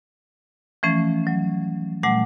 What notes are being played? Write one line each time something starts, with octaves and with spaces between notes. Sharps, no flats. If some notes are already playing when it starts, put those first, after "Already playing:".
E3 F3 A3 C#4
F#3
A#2 G3 A3 F#5